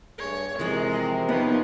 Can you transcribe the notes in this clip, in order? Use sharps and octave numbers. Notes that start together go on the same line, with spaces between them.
G2 A3 G#4 C#5
C3 E3 F3 G#3 A#4
F3 B3 D#4 B4 C#5